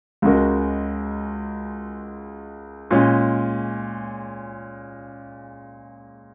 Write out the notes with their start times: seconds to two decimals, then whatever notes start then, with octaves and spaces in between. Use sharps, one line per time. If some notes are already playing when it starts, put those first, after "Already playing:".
0.22 C#2 C#3 G#3 F#4 A#4
2.91 A#2 G#3 C#4